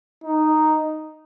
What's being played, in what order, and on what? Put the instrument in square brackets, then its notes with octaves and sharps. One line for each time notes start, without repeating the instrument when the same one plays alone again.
[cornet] D#4